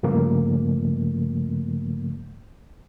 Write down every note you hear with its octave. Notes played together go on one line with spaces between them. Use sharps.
G2 C#3 F3 A3 A#3